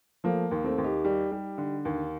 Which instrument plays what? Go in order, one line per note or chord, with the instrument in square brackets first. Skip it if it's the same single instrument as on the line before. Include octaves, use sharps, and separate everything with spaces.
[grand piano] F3 A3 [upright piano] A#3
[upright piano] D#2
[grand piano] A3 C4
[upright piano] D#2
[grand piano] D#4 G4
[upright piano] G3
G3
D3
D#2